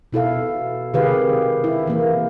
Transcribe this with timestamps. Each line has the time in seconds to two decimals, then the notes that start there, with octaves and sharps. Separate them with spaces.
0.13 B2 E4 A4 F5
0.94 C3 D#3 G4 G#4 B4 F5
1.64 E4
1.87 E3 A#3